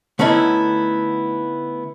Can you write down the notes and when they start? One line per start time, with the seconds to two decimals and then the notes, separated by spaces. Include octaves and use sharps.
0.19 D3 A3 B3 C#4 D#4 E4